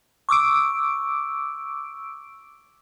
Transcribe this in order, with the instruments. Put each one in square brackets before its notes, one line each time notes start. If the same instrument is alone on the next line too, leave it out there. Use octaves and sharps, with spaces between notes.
[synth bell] C#6 D6 E6 D7